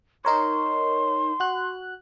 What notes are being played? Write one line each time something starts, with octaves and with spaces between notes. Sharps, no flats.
D#4 A#4 C#5 C6
F#4 F#6